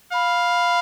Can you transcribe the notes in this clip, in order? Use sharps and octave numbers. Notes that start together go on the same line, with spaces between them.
F5 B5